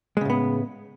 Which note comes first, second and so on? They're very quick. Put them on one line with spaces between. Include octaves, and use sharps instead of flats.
G#3 C#3 A2 B3